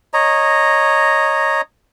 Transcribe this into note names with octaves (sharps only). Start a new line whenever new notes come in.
C#5 D#5 A#5